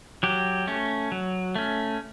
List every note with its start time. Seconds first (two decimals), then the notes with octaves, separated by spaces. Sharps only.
0.23 F#3 G4
0.67 A3 C#4
1.12 F#3
1.56 A3 C#4